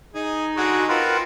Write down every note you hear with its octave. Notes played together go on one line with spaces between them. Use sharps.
D#4 G#4
D3 G#3 F#4 G#4
C4 F4 A#4 B4 F#5